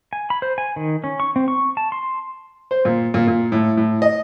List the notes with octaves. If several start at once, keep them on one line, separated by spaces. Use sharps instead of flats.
G#5
B5
C5
G#5
D#3
C#4
C#6
C4
C#6
A5
C6
C5
A#2
A#2
A#2
A2
A2
D#5